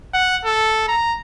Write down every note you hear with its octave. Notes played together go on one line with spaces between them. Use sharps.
F#5
A4
A#5